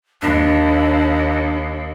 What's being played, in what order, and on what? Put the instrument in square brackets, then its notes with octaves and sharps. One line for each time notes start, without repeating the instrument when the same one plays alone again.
[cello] D#2 [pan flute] D4